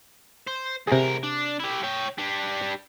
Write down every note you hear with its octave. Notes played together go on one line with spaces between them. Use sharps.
C5
E2 C3 G#4 A#4
D4
E4 G4
C#5 G5
G3 D4